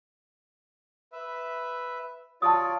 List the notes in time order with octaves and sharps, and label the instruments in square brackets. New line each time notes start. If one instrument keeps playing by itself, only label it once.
[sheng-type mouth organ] B4 E5
[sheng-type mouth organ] F4 C#5 D5 [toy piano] A5 D#6